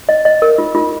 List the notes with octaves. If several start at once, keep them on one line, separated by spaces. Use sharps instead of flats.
D#5
D#5
A#4
F4
F4